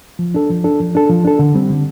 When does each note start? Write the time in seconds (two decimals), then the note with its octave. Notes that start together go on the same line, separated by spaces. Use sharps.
0.19 F3
0.34 D4 A4
0.50 F3
0.64 D4 A4
0.80 F3
0.95 D4 A4
1.09 F3
1.24 D4 A4
1.39 D3
1.55 G3 C4
1.69 D3